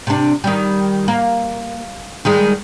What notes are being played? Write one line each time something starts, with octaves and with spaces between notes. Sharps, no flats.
C3 D4
D#3 G3
A#3
D#3 G3 G#3